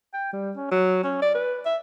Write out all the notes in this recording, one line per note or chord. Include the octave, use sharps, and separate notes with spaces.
G5
G3
C#4
F#3
C#4
D5
B4
E5